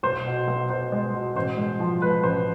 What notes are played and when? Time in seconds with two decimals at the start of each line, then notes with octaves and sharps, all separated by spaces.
0.03 B1 C5
0.26 B2
0.48 B1
0.70 B2 C5
0.92 G#3
1.14 B2
1.36 A1 C5
1.57 G#3
1.80 F3
2.02 G#3 B4
2.23 A1 C5